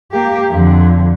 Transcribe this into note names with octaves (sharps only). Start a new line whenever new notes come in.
A#3 G4
F2 D3